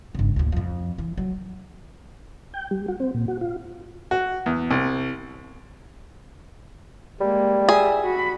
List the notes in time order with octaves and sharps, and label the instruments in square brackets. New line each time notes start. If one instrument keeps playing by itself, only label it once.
[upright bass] G1 C#3
D2 A#2
F2 F3
E3
F#3
[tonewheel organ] G5
G3
F#4
C4
A#2
F#4
F4
[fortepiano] F#4
E2
C2
[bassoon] G3 [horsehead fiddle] G#3 A#3
[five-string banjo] G#4 [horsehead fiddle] E5
[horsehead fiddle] F#4 B5